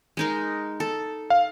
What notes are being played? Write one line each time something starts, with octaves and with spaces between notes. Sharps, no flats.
G#3 D#4 A#4
A4
F5